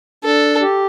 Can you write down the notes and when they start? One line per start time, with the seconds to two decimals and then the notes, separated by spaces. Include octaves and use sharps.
0.24 D4 A4
0.61 G4